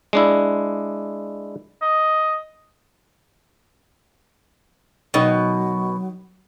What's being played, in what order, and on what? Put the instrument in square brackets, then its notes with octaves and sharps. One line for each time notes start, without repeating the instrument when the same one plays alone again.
[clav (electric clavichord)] G#3 D4 E4
[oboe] D#5
[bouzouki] B2 [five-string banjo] D#3 D#4 [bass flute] F#3